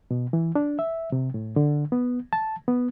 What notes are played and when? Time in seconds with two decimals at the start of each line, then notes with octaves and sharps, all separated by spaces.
0.11 B2
0.33 E3
0.55 D4
0.79 E5
1.12 C3
1.34 A2
1.56 D3
1.92 B3
2.33 A5
2.68 B3